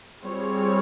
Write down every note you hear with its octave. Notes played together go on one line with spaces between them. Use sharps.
G3 C4 F4 G#4 C#5